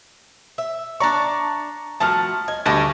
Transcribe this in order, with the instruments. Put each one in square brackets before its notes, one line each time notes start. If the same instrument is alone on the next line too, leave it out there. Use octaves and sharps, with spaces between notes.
[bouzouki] E5
[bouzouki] D4 D5 [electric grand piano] A#5 C#6
[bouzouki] F3 A3 F#4 [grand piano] A5 F6
[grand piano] D#5 [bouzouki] G#5
[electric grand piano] D2 [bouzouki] G3 D#4 [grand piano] A5 C#6